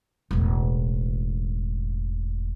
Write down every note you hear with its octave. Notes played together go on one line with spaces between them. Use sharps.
E1 A1